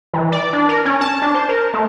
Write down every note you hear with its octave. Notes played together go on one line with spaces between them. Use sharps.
E3
D5
D4
A#4
C#4
A5
D4
C5
A#4
A3